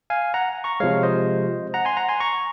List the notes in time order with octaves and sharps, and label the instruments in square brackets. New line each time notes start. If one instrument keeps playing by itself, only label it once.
[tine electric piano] F5 G#5
F#5 A#5
A#5 C#6
C3 F3 G#3 C#5 F5
C5 D#5
F#5 A#5
G#5 C6
F#5 A#5
G#5 C6
A#5 C#6